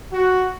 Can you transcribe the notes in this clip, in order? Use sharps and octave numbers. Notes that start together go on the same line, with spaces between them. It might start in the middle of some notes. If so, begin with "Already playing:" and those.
F#4